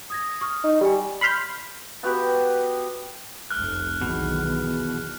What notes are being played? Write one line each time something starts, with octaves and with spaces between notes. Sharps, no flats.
D#6 G#6 A#6
C#6 D#6 F6
D#4
G3 G4 G#5
B5 C6 F6 G6
B3 F#4 G4 B4
F1 C2 A3 F6 F#6
B1 E2 B2 D#3